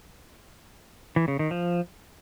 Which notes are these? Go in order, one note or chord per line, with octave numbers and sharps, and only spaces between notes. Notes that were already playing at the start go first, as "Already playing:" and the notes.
E3
C#3
D#3
F3